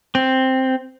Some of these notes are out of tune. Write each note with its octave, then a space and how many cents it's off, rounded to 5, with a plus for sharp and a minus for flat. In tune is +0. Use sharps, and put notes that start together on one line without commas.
C4 +0